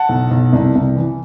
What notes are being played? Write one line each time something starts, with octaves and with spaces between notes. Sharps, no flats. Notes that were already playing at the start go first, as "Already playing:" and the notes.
Already playing: F#5 A5
B1
B1
C2
C2
E3